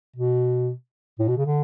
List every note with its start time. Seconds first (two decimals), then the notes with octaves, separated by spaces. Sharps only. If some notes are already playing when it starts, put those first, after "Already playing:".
0.16 B2
1.19 A2
1.28 B2
1.37 C#3
1.46 D3